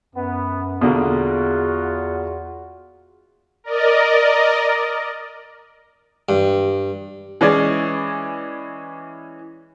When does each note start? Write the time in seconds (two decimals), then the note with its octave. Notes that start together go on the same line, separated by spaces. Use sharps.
0.15 F#2 B3
0.81 E2 B2 D3 A#3 F4 F#4
3.64 A#4 D5 D#5
6.29 G2
7.41 E3 G#3 C#4 G#4 D5